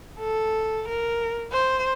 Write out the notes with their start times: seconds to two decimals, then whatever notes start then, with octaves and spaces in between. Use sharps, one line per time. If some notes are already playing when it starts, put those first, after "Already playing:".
0.19 A4
0.88 A#4
1.52 C5